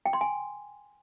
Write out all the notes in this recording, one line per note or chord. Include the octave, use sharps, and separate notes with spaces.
G5
C6
G#5